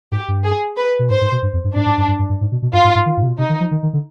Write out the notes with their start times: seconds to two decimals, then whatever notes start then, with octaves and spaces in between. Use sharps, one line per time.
0.12 G#2 G4
0.28 G2
0.44 G#4
0.77 B4
0.99 B2
1.10 G#2 C5
1.21 G#2
1.32 B2
1.43 G2
1.53 F2
1.64 G2
1.75 G#2 D4
1.86 G#2
1.98 G2
2.08 G2
2.19 G2
2.30 G2
2.41 G#2
2.52 B2
2.62 B2
2.73 G2 F4
2.84 G#2
2.95 G#2
3.06 D#3
3.17 G#2
3.23 C3
3.27 B2
3.38 C3 D#4
3.49 D#3
3.60 F3
3.71 D#3
3.83 D#3
3.93 D3